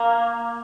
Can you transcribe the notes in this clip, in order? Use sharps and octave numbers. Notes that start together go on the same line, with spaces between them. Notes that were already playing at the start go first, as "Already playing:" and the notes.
Already playing: A#3